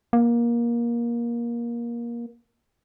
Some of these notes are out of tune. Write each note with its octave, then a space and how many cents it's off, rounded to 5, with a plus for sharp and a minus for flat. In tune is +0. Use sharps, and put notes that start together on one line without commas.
A#3 +20